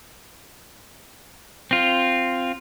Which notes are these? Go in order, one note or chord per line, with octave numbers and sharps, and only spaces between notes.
C4 F4